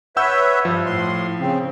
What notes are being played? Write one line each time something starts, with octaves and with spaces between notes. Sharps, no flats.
B4 C#5 E5 F#5 E6 G6
G2 F3
A2 C6
C#3 C4